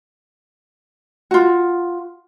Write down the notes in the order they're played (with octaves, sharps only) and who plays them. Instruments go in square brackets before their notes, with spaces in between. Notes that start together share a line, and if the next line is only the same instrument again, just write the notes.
[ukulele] F4 F#4